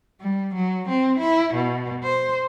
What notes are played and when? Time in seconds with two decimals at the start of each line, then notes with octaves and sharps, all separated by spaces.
0.21 G3
0.55 F#3
0.89 C4
1.20 E4
1.54 B2
2.03 C5